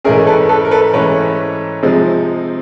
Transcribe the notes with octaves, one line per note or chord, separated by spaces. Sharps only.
G#2 E3 A3 C#4 G#4 A#4
A4 B4
A4 B4
A#4
A4 B4
G#2 E3 A3 C#4 B4 C#5
C3 F3 G#3 C4 D#4